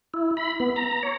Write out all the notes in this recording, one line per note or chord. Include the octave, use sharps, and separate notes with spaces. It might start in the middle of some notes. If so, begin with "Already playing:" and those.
E4
B5
B3
A#5
C#5